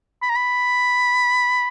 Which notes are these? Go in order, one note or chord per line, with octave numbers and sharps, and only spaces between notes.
B5
A#5
B5